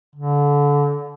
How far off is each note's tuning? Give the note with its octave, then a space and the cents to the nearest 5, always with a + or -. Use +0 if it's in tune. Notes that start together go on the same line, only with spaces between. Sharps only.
D3 -30